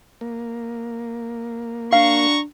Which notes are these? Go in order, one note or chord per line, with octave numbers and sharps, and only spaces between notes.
A#3
D4 F#4 F5 A#5 C#6